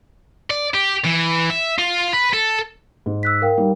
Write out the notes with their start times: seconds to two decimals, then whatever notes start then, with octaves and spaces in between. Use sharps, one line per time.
0.50 D5
0.74 G4
1.05 E3
1.50 E5
1.78 F4
2.13 B4
2.33 A4
3.06 G#2
3.23 E6 F#6 B6
3.42 A#4 F5 G5
3.57 G3 D#4